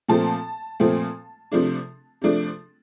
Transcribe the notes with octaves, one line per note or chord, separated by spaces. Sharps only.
A#2 F3 A3 C4 A5
A#2 F3 A3 C4
C3 F3 A3 D4
C3 F3 A3 D4